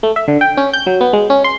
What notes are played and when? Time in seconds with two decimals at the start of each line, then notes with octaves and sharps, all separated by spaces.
0.03 A3
0.16 E5
0.28 D3
0.41 G5
0.57 C#4
0.73 G6
0.87 F#3
1.01 B3
1.13 G#3
1.30 C#4
1.44 C6